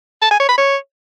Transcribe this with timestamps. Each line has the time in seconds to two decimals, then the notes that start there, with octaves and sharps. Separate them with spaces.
0.22 A5
0.31 G#5
0.40 C#5
0.49 B5
0.58 C#5